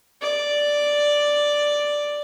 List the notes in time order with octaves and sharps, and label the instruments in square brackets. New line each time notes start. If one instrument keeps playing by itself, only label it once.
[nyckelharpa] D5